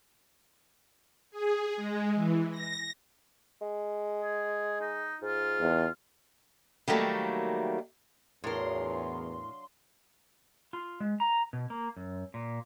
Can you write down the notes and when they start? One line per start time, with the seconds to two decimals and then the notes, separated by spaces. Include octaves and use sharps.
1.31 G#4
1.76 G#3
2.15 E3
2.51 A#6
3.61 G#3
4.22 G#4
4.80 D#4
5.22 G#2 F4
5.61 E2
6.88 D#3 F#3 G3 A3 A#3
8.44 E2 A2 F#3 D4 F4 A#4 C6
10.73 F4
11.00 G#3
11.20 A#5
11.53 B2
11.70 A#3
11.97 F#2
12.34 A#2